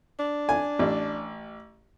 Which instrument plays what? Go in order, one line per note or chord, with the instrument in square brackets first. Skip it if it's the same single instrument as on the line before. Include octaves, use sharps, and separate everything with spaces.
[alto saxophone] D4
[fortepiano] G#5
A1